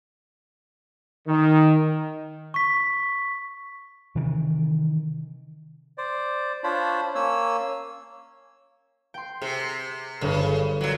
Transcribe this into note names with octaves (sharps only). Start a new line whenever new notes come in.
D#3
C#6 B6
C3 D#3 E3
C5 D5
D4 F4 C5 C#5 B5
A#3 C#4 C#5 E6
G5 C6
C3 G#4
G1 G2 C#3
A#2 F#3